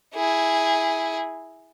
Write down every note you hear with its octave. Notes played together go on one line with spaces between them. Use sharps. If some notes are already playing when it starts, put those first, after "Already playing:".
E4 G#4